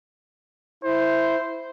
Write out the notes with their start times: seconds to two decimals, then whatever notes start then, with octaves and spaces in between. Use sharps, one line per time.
0.84 E4 C5